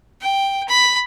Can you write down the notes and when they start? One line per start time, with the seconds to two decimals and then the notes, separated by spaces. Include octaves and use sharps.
0.21 G5
0.68 B5